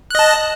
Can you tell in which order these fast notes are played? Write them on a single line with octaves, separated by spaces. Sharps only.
F#6 D#5 A5